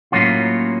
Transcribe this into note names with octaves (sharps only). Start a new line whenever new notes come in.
A2 F#3 A#3 C#4 F4